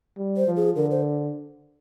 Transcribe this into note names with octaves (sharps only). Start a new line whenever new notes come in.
G3
C5
F3
G#4
D3 A#4
C5